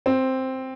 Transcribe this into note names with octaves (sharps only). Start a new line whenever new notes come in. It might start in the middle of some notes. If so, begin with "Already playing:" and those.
C4